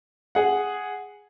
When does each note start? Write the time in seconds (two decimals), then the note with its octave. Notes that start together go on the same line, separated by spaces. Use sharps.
0.35 G#4 F#5